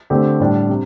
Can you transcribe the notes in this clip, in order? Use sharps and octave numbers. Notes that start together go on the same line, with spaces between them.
D3 A3 C4 G4
A2 G3 D4
C3